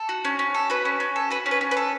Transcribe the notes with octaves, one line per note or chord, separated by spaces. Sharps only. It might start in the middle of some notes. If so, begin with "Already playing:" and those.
Already playing: A4
F#4
C#4
C#4
A4
F#4 B4
C#4
C#4
A4
F#4 B4
C#4
B4
C#4
B4
A4